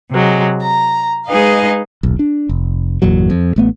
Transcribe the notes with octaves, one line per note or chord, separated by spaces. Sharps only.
C3 F#3 G#3
A#5
G#3 D#4 G#4 B4 D#5 F5
D#1 B1
D4
F1
G1 E2 A#2 F#3
F2
A1 A3 B3